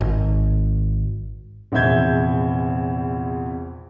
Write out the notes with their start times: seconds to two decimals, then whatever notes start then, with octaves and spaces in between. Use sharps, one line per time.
0.01 G#1
1.72 A#1 E2 C3 E5 G6 G#6